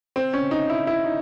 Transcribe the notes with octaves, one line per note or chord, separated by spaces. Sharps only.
C4
C#4
D#4
E4
E4
D#4